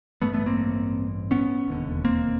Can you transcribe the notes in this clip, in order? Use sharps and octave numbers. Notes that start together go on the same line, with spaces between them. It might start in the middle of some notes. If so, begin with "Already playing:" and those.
A1 G2 D3 A3 B3
A3 B3
A#3 C4
B3 C#4
E1 D#2 D3
A#3 C4